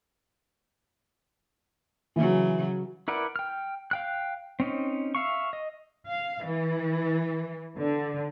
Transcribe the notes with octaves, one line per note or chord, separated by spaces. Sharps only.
C#3 E3 F#3
E4 A#4 B4 D5 F#5
G5 F6
F5 G5 F#6
C4 C#4 D#4
E5 F5 C#6
D#5
F5
E3
D3